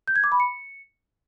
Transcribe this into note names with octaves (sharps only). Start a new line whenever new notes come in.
G6
G#6
D6
B5
C#7